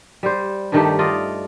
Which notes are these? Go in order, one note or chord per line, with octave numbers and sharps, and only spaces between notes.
G3 C5
G2 D#3 A3 G4
F4 D5 D#5